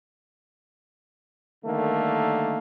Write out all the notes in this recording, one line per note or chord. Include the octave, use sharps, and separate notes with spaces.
D3 D#3 G3 A3 A#3